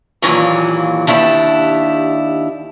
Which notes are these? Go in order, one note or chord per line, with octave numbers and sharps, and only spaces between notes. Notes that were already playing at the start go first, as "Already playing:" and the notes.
D#2 A#2 C#3 E3 F#3
D#2 D4 E4 G4